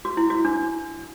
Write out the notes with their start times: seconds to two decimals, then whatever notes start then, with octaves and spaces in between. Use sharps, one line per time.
0.05 F#4
0.17 E4
0.30 F#4
0.45 D4